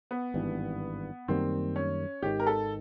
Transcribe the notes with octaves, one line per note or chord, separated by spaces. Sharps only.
B3
G#1 G2 E3
F#2 D#3 G3 A#3 C4
C#4
G#1 G#2 D#3 G4
A#4
A4